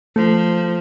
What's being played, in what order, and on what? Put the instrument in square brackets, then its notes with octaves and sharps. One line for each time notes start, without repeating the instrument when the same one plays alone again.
[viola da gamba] F3 [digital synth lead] A3